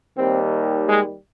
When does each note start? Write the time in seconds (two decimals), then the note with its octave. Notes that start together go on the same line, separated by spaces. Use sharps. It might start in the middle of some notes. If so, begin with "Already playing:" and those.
0.17 D#2 D#3 G3 C4
0.88 G#3